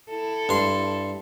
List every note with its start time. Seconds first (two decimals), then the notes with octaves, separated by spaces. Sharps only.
0.10 E4 A4
0.49 G2 C6